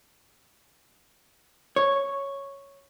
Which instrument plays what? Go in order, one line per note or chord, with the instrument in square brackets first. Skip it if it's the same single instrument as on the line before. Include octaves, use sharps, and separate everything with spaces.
[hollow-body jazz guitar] C#5